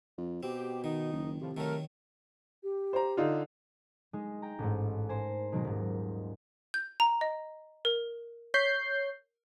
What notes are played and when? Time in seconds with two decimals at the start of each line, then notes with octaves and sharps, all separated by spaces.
0.18 F2
0.43 B2 C4 G4
0.84 D#3 D#4
1.13 F#1
1.41 A2 C3 F3
1.57 D#3 F#3 A3 A#4
2.63 G4
2.93 C5 A#5
3.17 D3 D#4 F4
4.13 G#3 D#4
4.42 G5 A#5
4.59 A1 G#2
5.09 A#4 C5 G#5
5.52 B2 D#3 F#3 G#3 D#4 A#4
5.64 D#1 G#2
6.74 G6
7.00 A#5
7.21 D#5
7.85 A#4
8.54 C#5 G6 B6 C7